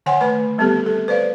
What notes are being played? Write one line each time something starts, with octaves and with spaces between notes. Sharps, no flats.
D3 D#3 C#5 F#5 G#5 C6
A3 B4 B5
G3 B3 C4 G4 A4
A4
B4 C5 D5 F5